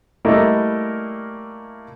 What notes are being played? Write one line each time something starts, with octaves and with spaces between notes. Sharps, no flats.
G3 A3 A#3 E4 A#4 D#5